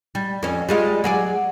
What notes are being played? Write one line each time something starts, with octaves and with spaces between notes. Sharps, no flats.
G3
F2 C#4
G3 G#3 F4
F#3 G#4 D5